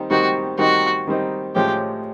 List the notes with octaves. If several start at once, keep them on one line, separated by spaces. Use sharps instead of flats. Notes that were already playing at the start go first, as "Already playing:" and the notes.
Already playing: D#3 G3 C4 D#4
D#3 G3 C4 D#4 F#4
D#3 G3 C4 D#4 F#4
D#3 G3 C4 D#4
A2 F3 G#3 C#4 G4